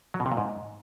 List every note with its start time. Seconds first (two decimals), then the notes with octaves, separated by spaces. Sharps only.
0.14 F#3
0.20 B2
0.26 C3
0.32 A#2
0.37 G#2